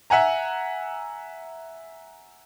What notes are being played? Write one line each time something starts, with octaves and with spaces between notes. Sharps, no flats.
E5 F#5 G#5 A#5